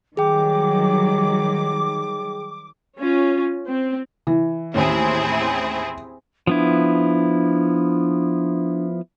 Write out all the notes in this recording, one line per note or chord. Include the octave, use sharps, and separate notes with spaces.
D#3 F#3 G3 G#4 G5 D6
C#4 F4
C4
E3
D#2 A2 C4 C#4 E4 G#4
F3 B3 D4 E4